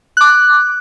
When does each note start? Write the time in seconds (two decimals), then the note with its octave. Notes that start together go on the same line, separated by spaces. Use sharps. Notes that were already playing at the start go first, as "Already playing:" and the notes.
0.17 D6 F#6